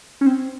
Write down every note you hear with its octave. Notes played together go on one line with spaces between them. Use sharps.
C#4
C4